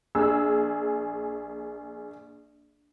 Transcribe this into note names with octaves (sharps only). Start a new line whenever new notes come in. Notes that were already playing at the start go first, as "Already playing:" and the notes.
A#1 G#4 E6